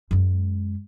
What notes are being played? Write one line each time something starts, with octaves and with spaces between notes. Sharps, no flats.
F#2 G#3